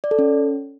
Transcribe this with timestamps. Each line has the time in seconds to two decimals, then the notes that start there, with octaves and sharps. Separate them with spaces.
0.04 D5
0.11 A4
0.19 C#4